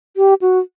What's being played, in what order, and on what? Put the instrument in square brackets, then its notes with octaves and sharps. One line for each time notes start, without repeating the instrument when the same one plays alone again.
[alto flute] G4
F#4